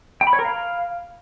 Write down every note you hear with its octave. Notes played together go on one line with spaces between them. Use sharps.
G5
B5
C#5
A#4
F5